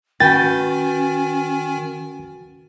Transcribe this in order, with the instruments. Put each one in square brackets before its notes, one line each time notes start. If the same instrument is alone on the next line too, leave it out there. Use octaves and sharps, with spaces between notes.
[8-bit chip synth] D#3 G#5 [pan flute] C#4 [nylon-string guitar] F#4 B4 G5 [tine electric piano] A6